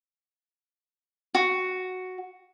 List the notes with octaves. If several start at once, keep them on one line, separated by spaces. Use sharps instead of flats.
F#4